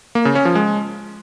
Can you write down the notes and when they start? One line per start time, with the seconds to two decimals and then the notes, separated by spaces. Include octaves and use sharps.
0.15 A#3
0.25 C#3
0.35 C#4
0.45 F3
0.55 G#3